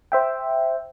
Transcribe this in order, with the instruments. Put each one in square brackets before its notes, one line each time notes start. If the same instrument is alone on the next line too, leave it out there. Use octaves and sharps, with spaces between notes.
[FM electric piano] C5 E5 G5